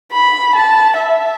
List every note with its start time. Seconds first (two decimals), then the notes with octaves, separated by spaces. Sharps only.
0.12 B5
0.56 A5
0.99 E5